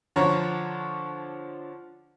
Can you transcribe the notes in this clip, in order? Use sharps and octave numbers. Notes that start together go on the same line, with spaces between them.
D3 F3 C#5 A#5